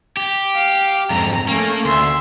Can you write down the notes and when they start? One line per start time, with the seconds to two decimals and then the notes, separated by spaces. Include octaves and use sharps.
0.17 G4
0.55 F5
1.10 F2 G#2 A#5
1.48 A3 A#3 C#4
1.85 D2 E5 C6